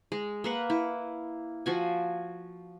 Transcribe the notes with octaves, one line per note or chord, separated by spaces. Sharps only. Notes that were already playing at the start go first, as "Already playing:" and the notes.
G#3
A#3 B4 F#5
E4
F3 F#4 G#5